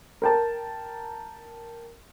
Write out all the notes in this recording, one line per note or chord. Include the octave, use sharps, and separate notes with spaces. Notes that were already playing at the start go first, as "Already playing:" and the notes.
A#4 G5 A5